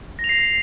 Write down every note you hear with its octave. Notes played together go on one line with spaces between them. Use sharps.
A#6
F7
C7